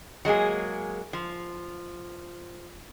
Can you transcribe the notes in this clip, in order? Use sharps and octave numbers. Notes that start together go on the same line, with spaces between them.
F#3 G#3 A#3 G#4
F3